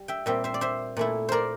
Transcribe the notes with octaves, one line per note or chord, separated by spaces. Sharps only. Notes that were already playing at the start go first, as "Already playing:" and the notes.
Already playing: G3
E5 G5
A#2 G3 C4 E5 G5
C5 E5
D5
C5 E5
A#2 A3 E4
A#4 C5 D5